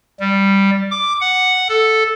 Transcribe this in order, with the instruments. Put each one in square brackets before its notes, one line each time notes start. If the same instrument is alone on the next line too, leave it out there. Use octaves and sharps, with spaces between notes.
[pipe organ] G3
D6
F#5
A4